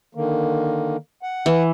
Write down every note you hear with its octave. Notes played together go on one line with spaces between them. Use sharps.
D3 D#3 A#3
F#5
E3